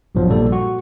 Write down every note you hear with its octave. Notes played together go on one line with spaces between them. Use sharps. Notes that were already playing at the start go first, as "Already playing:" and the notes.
A#1 G2 B2 F3 F#3
A#1 A#2 G3 A#3 A4
F#4 C#6